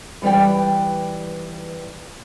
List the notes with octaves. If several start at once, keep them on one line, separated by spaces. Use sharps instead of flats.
E3 G3 B4 D5 G5